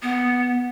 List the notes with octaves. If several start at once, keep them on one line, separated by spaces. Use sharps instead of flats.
B3